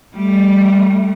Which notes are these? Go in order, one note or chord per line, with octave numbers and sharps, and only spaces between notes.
G3 A3